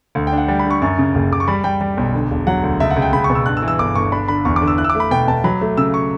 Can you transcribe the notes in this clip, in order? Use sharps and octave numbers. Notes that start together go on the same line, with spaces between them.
D2
G5
D4
F#5
G3 G5
B5
D3
C#6
F#2 C#6
C#3
F#1
F#1 D6
C#6
G3 B5
G3 G5
G3
B1
D3
E1
F#3 F#5
D2
C#2 E5
F#5
C#2
G5
C#2 B5
C#6
B2
E6
G2 F#6
E6
E3
E6
G1 D6
G1 C#6
D4 B5
D3 B5
E2 C#6
D6
D3
E6
E4 F#6
E6
D6
A3
B5
B2 G5
B2 A5
F#3 B5
A3
C#3 E6
C#6